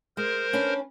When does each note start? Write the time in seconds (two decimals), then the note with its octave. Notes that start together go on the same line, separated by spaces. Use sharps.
0.17 G#3 A#4 C5
0.53 C#4 D4 B4